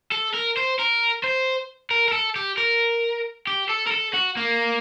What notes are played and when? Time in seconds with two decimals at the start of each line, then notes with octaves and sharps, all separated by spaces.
0.12 A4
0.34 A#4
0.57 C5
0.79 A#4
1.24 C5
1.91 A#4
2.08 A#4
2.13 A4
2.36 G4
2.58 A#4
3.47 G4
3.69 A4
3.87 A#4
3.92 A4
4.14 F#4
4.37 A#3